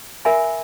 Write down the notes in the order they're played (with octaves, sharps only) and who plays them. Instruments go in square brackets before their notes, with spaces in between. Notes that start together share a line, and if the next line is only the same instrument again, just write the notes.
[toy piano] A#4 E5 G#5 B5